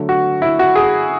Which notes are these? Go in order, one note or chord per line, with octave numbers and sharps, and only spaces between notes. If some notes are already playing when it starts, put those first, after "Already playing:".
Already playing: D3 F#3 A3
F#4
E4
F#4
G#4